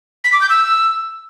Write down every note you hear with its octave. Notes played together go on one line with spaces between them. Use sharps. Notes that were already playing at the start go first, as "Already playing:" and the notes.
B6
D6
G6
E6